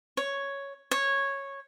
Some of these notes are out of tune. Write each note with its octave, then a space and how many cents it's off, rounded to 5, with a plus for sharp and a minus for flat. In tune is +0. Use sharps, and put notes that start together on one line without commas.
C#5 +0
C#5 -10